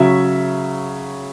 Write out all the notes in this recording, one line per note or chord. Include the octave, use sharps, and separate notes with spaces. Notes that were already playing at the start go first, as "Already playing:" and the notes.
Already playing: C#3 F#3 E5